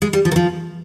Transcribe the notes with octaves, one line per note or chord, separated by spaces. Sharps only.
G#3
G3
F3
D#3
F3